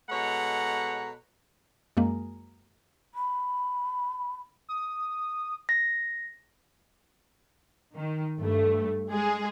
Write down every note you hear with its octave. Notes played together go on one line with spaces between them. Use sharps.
B2 G#3 A4 C#5 F#5 A#5
F#2 G#3 A#3
B5
D#6
A#6
D#3
G2 A3
G#3 G#4